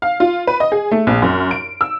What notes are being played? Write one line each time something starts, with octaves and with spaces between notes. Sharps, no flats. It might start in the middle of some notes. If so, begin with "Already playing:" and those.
F5
F4
B4
D#5
G#4
A3
A#1
F#2
D7
E6